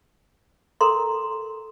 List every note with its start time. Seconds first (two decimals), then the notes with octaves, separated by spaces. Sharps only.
0.81 A4 A#4 A#5 C6